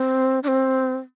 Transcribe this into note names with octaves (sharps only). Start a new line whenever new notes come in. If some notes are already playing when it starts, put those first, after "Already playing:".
Already playing: C4
D4
C4